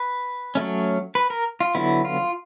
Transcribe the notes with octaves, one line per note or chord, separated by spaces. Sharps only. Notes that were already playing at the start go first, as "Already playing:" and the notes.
Already playing: B4
F#3 A3 C#4
B4
A#4
F4
D3 F#3 B3 E4
F4